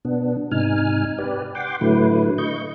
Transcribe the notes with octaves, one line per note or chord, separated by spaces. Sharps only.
B2 B3 D4
G#2 C3 D#4 G#5 F6
G4 B4 D5
F#5 G5 C6 D6
A2 D3 F#3 A3 E4 B4
D#5 C#6 G6